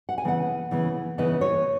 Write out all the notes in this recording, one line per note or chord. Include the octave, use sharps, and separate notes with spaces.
F#5
G#5
C#3 E3 B3 F#5
C#3 E3 B3
C#3 E3 B3 D#5
C#5